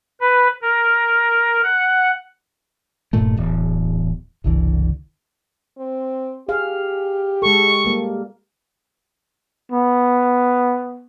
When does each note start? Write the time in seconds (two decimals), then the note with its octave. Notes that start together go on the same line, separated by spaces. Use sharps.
0.21 B4
0.62 A#4
1.63 F#5
3.13 D#1 G2 A#2 A3
3.37 D1 E2
4.44 F#1 C2 D3 E3
5.78 C4
6.49 G4 G#4 F5
7.42 G#3 A4 C#6
7.85 G3 A#3
9.72 B3